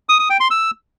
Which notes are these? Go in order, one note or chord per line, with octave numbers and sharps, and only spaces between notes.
D#6
D#6
G5
C6
E6